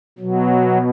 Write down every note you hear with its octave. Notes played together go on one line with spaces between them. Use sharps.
B2 F#3